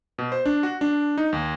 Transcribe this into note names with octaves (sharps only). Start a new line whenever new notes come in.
B2
C5
D4
F#4
D4
D#4
D#2